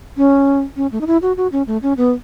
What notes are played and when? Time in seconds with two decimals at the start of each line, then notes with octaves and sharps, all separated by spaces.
0.17 C#4
0.76 C#4
0.92 A3
1.01 D#4
1.07 E4
1.22 F#4
1.37 F#4
1.52 C#4
1.67 A3
1.83 C#4
1.97 B3